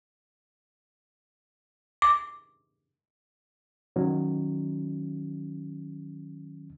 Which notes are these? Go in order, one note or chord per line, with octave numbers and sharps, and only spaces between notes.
D6
D#3 F#3 C#4